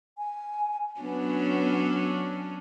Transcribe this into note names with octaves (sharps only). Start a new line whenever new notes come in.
G#5
F#3 B3 C#4 D4